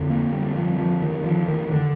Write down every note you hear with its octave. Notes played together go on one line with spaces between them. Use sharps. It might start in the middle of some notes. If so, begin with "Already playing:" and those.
Already playing: F2 D3
A#3
G3
F3
F3
D#3
F3
D#3
D3